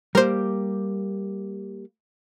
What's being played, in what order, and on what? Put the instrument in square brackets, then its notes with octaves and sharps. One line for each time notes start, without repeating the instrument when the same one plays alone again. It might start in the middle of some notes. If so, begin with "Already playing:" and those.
[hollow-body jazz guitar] G3 A#3 G4 [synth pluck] A#4 C5